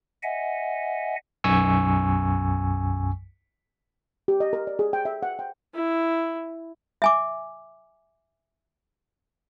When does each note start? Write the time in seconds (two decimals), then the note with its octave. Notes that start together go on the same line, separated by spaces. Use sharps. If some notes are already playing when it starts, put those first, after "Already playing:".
0.23 D#5 E5 F#5 G#5
1.44 B1 F#2 G#5 C#6 E6
4.28 G4
4.40 D#5
4.53 A#4
4.67 D5
4.79 G#4
4.93 G5
5.05 E5
5.23 F#5
5.39 G5
5.75 E4
7.02 E5 G#5 D6